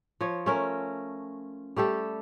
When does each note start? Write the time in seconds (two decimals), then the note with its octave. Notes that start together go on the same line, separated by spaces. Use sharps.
0.21 F3 C#5
0.46 A3 C#4 A#4
1.76 G3 A3 G4 A4